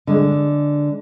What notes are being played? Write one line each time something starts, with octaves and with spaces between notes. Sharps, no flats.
D3 G#3